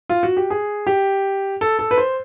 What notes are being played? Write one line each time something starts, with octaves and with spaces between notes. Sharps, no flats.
F4
F#4
G4
G#4
G4
A4
A4
B4
C5